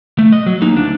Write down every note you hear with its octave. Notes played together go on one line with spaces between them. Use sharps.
A3
D#5
F#3
A#3 D#4
D2 D4